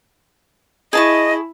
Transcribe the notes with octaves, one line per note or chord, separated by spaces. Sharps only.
E4 G#4 D#5 A5 C#6